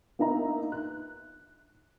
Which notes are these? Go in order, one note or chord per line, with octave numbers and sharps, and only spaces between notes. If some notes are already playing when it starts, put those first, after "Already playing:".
A#3 B3 D4 D#4 E5 A#5
F#6